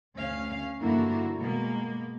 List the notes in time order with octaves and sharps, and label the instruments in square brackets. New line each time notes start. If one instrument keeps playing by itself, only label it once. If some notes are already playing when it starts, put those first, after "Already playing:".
[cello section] D2 C#4 F5
G2 D3 F3 A#3 E4 F#4
B2 G#3 A#3